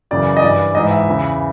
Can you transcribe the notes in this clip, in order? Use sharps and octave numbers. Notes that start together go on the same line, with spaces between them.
F#2 C#3 E3 D5
D#5
G2 E3 D5
G#2 E3 D#5
E5
E2 C#3 E3